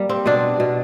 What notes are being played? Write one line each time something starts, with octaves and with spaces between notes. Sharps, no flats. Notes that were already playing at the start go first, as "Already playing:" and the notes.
Already playing: G3 A#3
C4
B2 C4 D4
B2